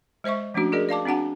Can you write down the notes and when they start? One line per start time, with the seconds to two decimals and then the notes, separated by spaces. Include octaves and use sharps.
0.24 G#3 C5 D#5 E5 C#6
0.54 F3 A3 C#4 D4 F#4
0.72 F#4 G#4 A#4 D5 D#5
0.89 D5 F5 A5 D6
1.05 C4 D4 F#4 F#5 A5